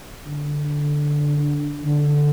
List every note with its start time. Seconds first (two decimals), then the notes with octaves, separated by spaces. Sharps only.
0.26 D3
1.85 D3